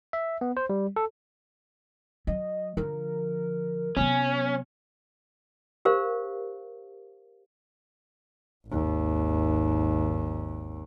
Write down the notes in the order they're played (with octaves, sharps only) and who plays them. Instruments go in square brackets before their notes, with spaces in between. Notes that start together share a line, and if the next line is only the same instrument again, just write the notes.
[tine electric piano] E5
B3
C5
G3
A4
[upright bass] F#3 [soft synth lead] D#5
[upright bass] D3 F3 [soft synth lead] A#4
[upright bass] C3 F#3 [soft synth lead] B3 [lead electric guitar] C#4
[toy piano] G4 A#4 C5 F5
[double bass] G#1 D#2